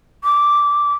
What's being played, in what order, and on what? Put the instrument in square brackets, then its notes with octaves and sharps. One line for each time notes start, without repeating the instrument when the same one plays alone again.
[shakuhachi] D6